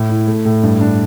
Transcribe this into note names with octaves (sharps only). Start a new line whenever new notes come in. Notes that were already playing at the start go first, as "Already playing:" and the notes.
Already playing: A2
E4
A3
A2
G2
D4